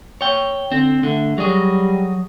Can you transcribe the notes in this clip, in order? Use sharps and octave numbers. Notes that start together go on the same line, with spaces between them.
C#5 G5
D3 C4
D3 A3
F#3 G3 G#4